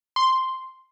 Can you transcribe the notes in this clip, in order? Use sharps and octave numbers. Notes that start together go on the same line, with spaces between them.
C6